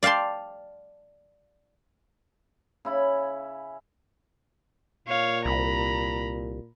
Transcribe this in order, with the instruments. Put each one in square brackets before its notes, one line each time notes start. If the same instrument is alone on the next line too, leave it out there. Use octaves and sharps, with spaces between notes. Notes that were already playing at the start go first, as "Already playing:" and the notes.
[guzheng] D5 F5 G5 A5 C6
[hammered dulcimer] C#3 E4 B5
[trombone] A#2 [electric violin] C#5 F5
[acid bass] C2 [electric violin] A#5 B5